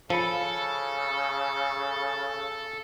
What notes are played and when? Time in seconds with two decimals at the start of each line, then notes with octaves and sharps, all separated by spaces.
0.10 C#3 F3 A4 B5 C#7 D#7